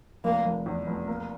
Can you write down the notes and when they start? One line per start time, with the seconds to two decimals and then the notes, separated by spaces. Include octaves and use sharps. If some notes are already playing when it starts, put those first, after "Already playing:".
0.24 F1 A#3
0.45 F1
0.66 E2
0.87 F1
1.07 A#3